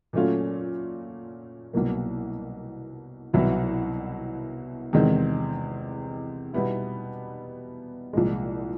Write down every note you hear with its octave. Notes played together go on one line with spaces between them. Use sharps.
A#2 F#3 A3 C#4 F4
C2 B2 F#3 A#3
C2 B2 F#3 B3 E4
E2 C3 D#3 G#3 C4
B2 G3 B3 E4
C2 A#2 F3 G#3